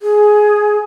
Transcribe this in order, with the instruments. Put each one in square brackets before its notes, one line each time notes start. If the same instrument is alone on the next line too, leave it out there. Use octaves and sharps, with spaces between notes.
[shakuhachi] G#4